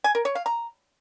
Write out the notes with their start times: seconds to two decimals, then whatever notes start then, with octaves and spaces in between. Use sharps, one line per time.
0.04 G#5
0.15 A#4
0.25 C#5
0.35 F5
0.46 A#5